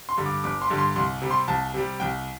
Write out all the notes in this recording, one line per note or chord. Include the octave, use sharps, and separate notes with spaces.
C6
G2 D3 G3
D6
G1 D6
C6
G2 D3 G3
C6
C2 C6
C3 G3
C6
C2 A5
C3 G3
C2 G5